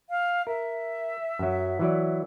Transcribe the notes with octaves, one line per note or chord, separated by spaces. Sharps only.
F5
A#4 E5
F#2 F#3
E3 F#3 D5